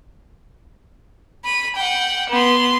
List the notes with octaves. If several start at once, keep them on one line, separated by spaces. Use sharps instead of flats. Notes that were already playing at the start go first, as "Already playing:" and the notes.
B5 D#7
F#5 G5
B3 C6